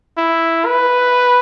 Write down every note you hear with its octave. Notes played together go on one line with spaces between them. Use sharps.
E4
B4